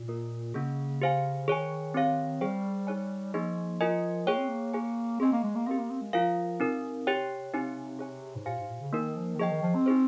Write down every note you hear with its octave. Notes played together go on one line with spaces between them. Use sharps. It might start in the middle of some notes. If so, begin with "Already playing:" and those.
Already playing: A#2
A#3 F4 A#4
C#3 A#3 C#4 G#4
G4 C5 F5 G#5
D#3 G#4 C#5 G#5
C4 G4 C#5 F5
G3 G#4 C5 G5
D#4 G#4 C#5 G#5
F3 A#3 D#4 G#4 D#5
F4 A#4 D#5 G#5
A#3 G#4 C#5 G5
C4
A#3
G#4 C#5 G#5
C4 G#4 D#5 G#5
A#3
G#3
A#3
C4 G4 A#4 F5
A#3
C4
G#3
F3 F4 A#4 F5 G#5
C3 C4 D#4 A#4
G4 C#5 G5
C4 D#4 G4 C#5 G#5
G#4 C#5 G#5
G#2
A#2 G4 C5 F5 G#5
G#2
A#2
C#3
D#3 A#3 D#4 A#4
F3
D#3
F3 G#4 D#5 G5
D#3
F3
C4
D#4 G#4 C5